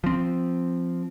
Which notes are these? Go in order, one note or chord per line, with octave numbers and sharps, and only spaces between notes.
F3 C4